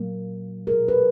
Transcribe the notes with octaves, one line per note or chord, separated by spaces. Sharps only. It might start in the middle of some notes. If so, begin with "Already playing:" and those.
Already playing: A#2 F#3 A#3
B2 G#3 G#4 A#4
A4 B4